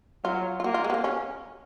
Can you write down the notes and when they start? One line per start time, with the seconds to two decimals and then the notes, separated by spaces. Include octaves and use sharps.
0.24 F#3 F4
0.60 F4
0.64 A#3 F#4
0.74 F4
0.84 G#3
0.90 B3
0.94 A#3
1.04 C#4